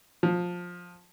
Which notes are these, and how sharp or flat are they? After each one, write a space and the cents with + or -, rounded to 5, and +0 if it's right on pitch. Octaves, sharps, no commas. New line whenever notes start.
F3 +20